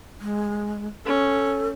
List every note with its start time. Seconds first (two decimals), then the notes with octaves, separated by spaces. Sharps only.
0.21 G#3
1.05 C#4 A4